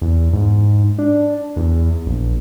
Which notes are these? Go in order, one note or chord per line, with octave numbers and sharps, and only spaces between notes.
E2
G#2
D4
E2
A#1